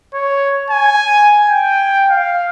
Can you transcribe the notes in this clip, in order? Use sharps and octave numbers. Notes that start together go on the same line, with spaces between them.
C#5
G#5
G5
F5